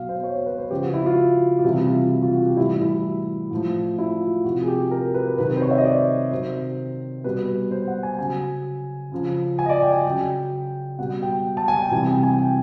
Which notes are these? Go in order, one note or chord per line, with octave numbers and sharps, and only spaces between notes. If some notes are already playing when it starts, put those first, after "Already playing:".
Already playing: B2 F#3 F5
C5
C#5
C5
B4
C5
C#3 F3 G4
F#4
E4
F4
F4
C3 E3 G3 E4
F4
F4
F4
F#4
G4
A2 E3 G3 E4
E4
A2 F3
E4
F4
C3 F3 F#4
G#4
G4
A#4
B4
C3 D#3 F#3 B4
C5
C#5
E5
D#5
D5
C3 D#3 F#3 C5
B2 G3 B4
C5
F#5
G#5
C#3 F#3 G#5
C#3 F3
G#5
D#5
D5
G5
G#5
C#3 F#3 G5
B2 G3 F#5
G5
A5
G#5
G5
C3 E3 G3 G#5
G5
G#5
G5